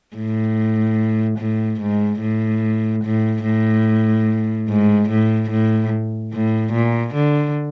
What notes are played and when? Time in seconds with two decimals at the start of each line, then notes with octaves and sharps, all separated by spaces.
0.16 A2
1.38 A2
1.80 G#2
2.21 A2
3.04 A2
3.44 A2
4.68 G#2
5.09 A2
5.50 A2
6.32 A2
6.73 A#2
7.14 D3